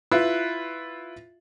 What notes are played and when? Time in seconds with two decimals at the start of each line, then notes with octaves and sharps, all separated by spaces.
0.11 E4 F4 B4